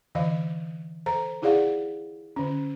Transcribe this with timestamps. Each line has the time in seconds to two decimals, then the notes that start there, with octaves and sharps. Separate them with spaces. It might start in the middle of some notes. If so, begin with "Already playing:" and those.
0.15 D3 E3 D#5 F5
1.06 A4 C5 A#5
1.42 D#4 E4 G#4 D5 F5 F#5
2.36 D3 C#4